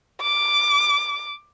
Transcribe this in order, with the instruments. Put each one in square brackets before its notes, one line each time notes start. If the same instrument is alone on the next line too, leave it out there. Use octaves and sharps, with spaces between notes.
[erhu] D6